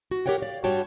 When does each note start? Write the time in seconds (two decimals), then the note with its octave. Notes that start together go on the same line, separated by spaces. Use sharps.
0.11 F#4
0.26 G4 A#4 C#5 F#5 G5
0.38 D5 F5
0.64 G2 G3 F#4 C#5 G5 A5